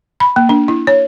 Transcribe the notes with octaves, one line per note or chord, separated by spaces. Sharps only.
B5
A#3
D4
E4
C#5